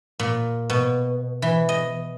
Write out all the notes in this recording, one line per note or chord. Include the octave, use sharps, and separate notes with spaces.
A#2
B2
E3
D#5